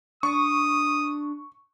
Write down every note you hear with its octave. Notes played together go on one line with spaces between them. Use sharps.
D4 C#6 D#6